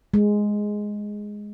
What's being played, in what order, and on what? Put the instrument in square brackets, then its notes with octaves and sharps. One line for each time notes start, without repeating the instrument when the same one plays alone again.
[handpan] G#3